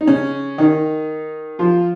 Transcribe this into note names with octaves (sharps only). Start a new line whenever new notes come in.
D#4
C#3 C#4
D#3 D#4
F3 F4